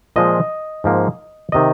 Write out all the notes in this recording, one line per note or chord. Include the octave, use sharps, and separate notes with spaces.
A#2 F3 G#3 D#5
G#2 F3 A#3
C3 D#3 D#5